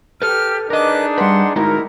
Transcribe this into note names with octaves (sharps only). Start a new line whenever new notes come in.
G4 A4 B4 F6
D4 D#4 G#4 A#4 B4 D#5 D6 F#6
G3 B4 F#5 C6
G#3 D#4 E4 F#4 A#4